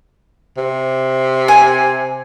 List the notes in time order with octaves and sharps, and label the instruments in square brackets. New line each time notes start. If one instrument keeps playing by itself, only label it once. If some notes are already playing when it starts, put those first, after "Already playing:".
[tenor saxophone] C3
[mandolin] G#5